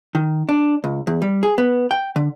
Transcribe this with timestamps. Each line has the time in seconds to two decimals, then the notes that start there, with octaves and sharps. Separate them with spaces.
0.15 D#3
0.49 D4
0.84 C#2
1.07 E2
1.22 G3
1.43 G#4
1.58 B3
1.91 G5
2.16 D3